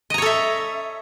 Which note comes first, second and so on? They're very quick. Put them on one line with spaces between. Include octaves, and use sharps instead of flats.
D#5 A#5 C#5 A4 E5